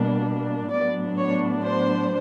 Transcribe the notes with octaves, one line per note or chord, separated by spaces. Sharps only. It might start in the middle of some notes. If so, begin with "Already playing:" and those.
Already playing: B2 G3 A#3 D4
A2 F#3 B3 D4 D5
C#5
C5